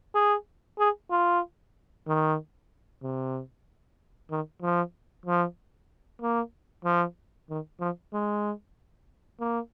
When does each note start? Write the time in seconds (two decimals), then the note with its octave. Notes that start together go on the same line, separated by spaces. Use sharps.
0.15 G#4
0.79 G#4
1.11 F4
2.07 D#3
3.03 C3
4.31 D#3
4.62 F3
5.26 F3
6.22 A#3
6.85 F3
7.50 D#3
7.80 F3
8.13 G#3
9.40 A#3